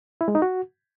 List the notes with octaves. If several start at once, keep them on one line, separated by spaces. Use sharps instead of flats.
E4
G#3
D#4
F#4